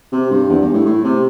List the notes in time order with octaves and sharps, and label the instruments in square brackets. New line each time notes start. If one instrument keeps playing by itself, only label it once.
[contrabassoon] C3
G2
E2
G2
A2
A2
C3